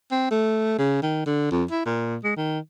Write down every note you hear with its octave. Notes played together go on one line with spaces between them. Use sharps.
C4
A3
C#3
D#3
D3
F2
E4
A#2
G#3
D#3